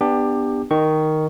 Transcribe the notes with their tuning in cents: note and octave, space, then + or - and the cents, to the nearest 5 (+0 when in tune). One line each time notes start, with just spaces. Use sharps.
B3 +0 D4 +10 G4 +20
D#3 +0 D#5 -10 C#6 +0